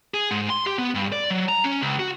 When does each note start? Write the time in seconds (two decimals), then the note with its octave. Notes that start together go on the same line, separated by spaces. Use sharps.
0.14 G#4
0.31 G#2
0.50 C6
0.67 G4
0.79 B3
0.95 G2
1.12 D5
1.31 F#3
1.49 A#5
1.64 C#4
1.82 C#2
1.99 F#4